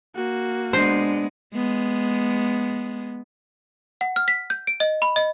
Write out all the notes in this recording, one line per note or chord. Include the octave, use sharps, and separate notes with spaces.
A#3 F#4
G#3 B3 D4 C5
G#3 B3
F#5
F6
B6
G6
D7
D#5
B5
D#5